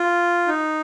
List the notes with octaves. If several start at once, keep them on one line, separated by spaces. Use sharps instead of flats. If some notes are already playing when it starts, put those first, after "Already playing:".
Already playing: F4
D#4